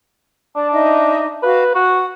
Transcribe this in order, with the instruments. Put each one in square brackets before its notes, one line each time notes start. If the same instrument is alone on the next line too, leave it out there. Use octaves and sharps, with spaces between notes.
[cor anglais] D4 [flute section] D5 A5
[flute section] D#4 D#5 E5
[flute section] F#4 F5 [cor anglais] B4
[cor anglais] F#4 [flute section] F#5